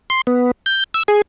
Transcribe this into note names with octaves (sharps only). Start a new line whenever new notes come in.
C6
B3
G6
E6
G#4